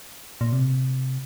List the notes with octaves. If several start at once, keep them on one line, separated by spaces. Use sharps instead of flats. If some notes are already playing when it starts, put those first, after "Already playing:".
A#2
C3